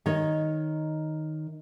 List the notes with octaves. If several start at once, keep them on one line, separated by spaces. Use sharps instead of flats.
D#3 C#5 D#5